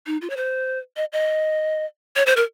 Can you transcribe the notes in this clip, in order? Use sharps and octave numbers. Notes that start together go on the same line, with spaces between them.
D#4
F4
C#5
C5
D#5
D#5
C#5
C5
A#4